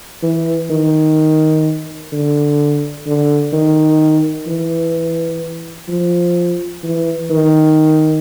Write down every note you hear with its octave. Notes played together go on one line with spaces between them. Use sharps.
E3
D#3
D3
D3
D#3
E3
F3
E3
D#3